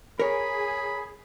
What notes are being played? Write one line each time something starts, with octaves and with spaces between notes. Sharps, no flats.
G#4 A#4 C#5 B5